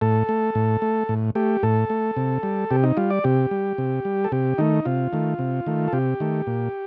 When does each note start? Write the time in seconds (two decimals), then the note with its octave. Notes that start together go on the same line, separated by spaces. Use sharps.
0.01 A2 A4
0.29 A3
0.55 A2
0.82 A3
1.09 A2
1.35 A3 G4
1.63 A2 A4
1.90 A3
2.17 C3
2.43 G3
2.71 C3 G4
2.84 D#4
2.97 G3 F4
3.10 D5
3.24 C3 G4
3.51 G3
3.78 C3
4.05 G3
4.24 A4
4.32 C3 G4
4.58 D#3 A3 D#4
4.85 C3 F4
5.13 D#3 A3
5.39 C3
5.67 D#3 A3
5.88 A4
5.93 C3 G4
6.20 D#3 A3
6.47 A#2